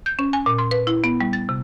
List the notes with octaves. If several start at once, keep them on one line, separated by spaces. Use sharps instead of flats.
G6
C#4
G#5
A#2
C6
B4
E4
B3
G3
A6
C3